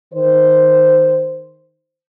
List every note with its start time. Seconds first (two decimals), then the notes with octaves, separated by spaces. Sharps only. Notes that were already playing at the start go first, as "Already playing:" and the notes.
0.13 D#3 C5